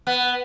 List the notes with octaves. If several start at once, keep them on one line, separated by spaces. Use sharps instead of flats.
B3